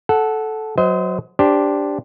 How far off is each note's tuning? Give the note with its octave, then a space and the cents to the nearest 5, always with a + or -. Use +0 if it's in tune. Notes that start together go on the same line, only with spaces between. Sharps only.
A4 -10 F#5 +0
F#3 -5 C5 -25 D#5 +30
D4 -10 G4 +0 C5 +0